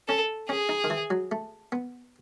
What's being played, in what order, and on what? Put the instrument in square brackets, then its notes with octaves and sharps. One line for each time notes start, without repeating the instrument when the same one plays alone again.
[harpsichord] C#4 [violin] A4
[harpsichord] C#4 [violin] G#4
[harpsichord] D#4
D#3
E3
F#3
A3
B3